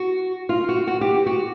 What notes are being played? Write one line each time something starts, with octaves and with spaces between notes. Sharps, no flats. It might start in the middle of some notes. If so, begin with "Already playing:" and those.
Already playing: F#4
F4
F#4
F#4
G4
G4
F#4